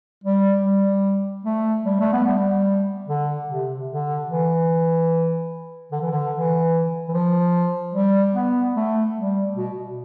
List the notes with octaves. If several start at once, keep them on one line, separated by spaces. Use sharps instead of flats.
G3
G3
A3
G3
A3
B3
G3
D3
C3
D3
E3
D3
E3
D3
E3
E3
F3
G3
B3
A3
G3
B2
B2